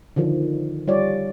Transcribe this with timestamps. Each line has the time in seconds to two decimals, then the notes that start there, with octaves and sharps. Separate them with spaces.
0.16 D3 D#3 F3
0.88 G3 F4 C#5 D5